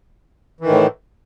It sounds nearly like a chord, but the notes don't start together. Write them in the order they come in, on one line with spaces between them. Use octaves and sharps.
E3 D#3 A2